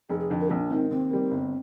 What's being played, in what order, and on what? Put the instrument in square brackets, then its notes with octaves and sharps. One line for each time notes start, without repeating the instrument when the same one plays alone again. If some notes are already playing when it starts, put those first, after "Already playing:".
[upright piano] F1 [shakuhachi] G#4
[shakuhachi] G#4
[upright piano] F2 D3
[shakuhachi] A#4
[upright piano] A#1 [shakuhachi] C4
[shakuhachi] D4
[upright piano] G#2 D#3 [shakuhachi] C4
[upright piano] D#2 [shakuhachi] C4
[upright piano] D#3 G3 A#3
G1